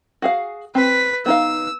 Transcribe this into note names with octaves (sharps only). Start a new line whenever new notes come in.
F#4 G#4 F5
C4 B4 B6
B3 D#4 F5 E6